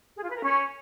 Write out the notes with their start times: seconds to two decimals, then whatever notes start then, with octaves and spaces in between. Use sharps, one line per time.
0.17 G#4
0.23 F4
0.30 B4
0.36 A#4
0.42 C#4